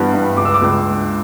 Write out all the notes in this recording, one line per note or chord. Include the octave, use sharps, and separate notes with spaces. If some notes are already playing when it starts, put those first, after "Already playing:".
Already playing: G2 E3 G3 B3
G2
C#2 D6
E6
D6
C#2